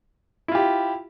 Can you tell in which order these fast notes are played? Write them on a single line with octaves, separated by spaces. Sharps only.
E4 F4 G4